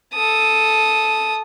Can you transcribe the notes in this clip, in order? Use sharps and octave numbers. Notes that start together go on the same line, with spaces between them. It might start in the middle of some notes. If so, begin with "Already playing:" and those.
A4 D#6